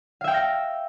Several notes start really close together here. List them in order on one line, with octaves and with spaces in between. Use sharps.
F5 E5 G5 E6 A#6